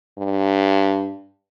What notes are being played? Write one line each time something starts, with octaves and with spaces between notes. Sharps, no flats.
G2